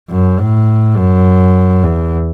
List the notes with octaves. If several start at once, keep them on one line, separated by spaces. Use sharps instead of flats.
F#2
A2
F#2
E2